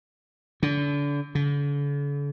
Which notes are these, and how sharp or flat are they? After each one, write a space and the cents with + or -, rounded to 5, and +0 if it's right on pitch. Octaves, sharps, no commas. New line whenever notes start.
D3 -35
D3 -45